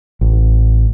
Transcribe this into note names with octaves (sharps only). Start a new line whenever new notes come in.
A1